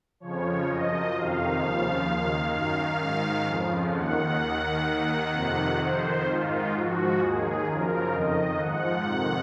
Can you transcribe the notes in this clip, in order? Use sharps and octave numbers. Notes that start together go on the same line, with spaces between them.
F2 C#3 F3 C#5
F#2 F3 D#5
F2 C3 D#3 F5
D#2 C#3 F3 F5
D#2 D#3
F#2 D#3 F5
G#2 D#3 F5
F2 C#3 F3
D#2 D#3 F#5
D#2 D#3 F#5
D#2 D#3 F#5
F2 C3 D#3
F2 D#3 C5
G#2 D#3 F4
G#2 F3 F#4
D#2 D#3 G#4
F#2 C#3 F3 A#4
F2 D#3 D#5
G#2 F3 F#5
F2 C3 D#3